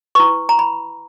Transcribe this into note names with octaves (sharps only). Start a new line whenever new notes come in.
E4 B4 C#6
A#5
B5